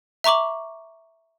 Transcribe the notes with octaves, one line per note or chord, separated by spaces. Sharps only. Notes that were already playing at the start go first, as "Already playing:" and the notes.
E5 A#5 C#6 D6 F#7